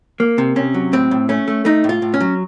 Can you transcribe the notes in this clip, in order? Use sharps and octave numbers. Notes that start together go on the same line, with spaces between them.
A#3
C3
C3 C#4
F#3
A2 C4
A2
A3 C#4
A3
A3 D#4
A2
F4
A2
C#4
F#3